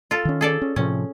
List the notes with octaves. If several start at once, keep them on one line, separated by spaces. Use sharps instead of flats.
F4 A4
D#3 C#4
G#4 A4 D5
C#4
A2 C3 F3 C#4